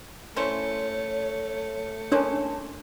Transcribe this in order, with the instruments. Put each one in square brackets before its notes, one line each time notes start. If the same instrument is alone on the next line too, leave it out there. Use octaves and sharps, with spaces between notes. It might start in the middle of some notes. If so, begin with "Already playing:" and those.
[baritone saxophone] A3 [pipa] C#4 E4 C5 [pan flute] C#5
[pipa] G#3 A#3 C#4 [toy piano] D4 C#5 C6 [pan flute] A5